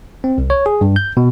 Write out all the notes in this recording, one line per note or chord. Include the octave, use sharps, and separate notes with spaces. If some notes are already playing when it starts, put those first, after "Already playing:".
C4
C2
C#5
G#4
G2
G6
B2